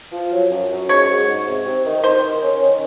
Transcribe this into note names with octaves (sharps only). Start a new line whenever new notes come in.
F3
F#3
F#2
F#2
G#2 C#5
G#2
G#2
C3
C3
D#3
D#3 C5
D#3
C#4
D#3